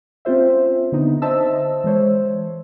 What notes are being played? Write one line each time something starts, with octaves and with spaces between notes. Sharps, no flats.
C4 C#4 F4 C5 E5
D3 B3 D4 D#4
C5 D#5 E5 A5 E6
E3 G#3 C5 C#5